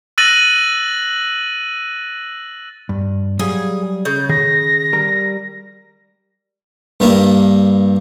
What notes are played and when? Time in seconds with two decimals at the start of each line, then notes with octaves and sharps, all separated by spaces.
0.18 E6 F#6 A6 A#6 D#7 F#7
2.89 G2
3.39 F#3 G3 G#4 F5
4.05 C#3 G6
4.29 D#3 G#4 A#6
4.93 G3 A#4 A#5
7.00 G2 G3 A#3 E4